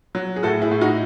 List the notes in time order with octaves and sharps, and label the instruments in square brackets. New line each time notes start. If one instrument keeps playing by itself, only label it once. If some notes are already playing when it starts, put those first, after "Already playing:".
[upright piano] F#3
G#4
A2 F#4 A4
E4 G#4
A2
D#4 F#4